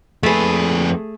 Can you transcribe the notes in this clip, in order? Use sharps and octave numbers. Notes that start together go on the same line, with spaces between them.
F2 A3 G#4 B4